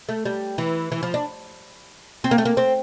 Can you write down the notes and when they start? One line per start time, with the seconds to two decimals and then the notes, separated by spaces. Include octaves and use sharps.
0.09 A3
0.25 G3
0.58 E3
0.92 E3
1.03 F3
1.14 D4
2.24 C4
2.31 A#3
2.38 A3
2.45 A#3
2.57 C4